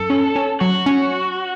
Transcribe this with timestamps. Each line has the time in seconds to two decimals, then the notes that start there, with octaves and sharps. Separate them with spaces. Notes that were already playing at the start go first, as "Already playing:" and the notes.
Already playing: F#2 A4
0.10 C#4
0.36 C#4
0.60 F#3 F#4
0.86 C#4